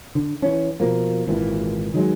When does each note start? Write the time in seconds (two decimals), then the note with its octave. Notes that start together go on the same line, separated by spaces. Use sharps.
0.15 D3
0.42 E3 C#4
0.80 B2 F3 A#3
1.27 G#1 A#2 E3
1.94 D#3 F#3 G#3